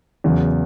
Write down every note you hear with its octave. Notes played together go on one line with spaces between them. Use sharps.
E2 C#3 F#3